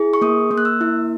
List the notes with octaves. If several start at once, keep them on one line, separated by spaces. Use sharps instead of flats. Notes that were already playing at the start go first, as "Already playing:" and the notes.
Already playing: E4 G#4
C#6
A#3 D#6
A#3
F#6
E6
E4